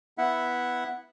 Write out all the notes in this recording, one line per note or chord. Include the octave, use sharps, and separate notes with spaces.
B3 E4 E5 F#5